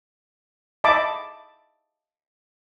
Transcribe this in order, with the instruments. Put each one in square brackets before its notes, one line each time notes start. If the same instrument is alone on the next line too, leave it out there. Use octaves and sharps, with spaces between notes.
[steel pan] D#5 E5 A5 B5 D6